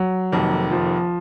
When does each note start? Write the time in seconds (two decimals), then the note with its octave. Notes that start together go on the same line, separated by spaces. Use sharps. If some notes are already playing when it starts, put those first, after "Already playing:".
Already playing: F#3
0.32 F1 F2 D#3 A#3
0.71 F3